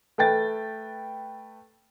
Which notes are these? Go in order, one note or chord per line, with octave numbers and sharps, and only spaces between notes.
A3 B4 G5 A6